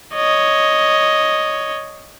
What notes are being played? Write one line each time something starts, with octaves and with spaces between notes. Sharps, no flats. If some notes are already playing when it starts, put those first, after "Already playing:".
C#5 D#5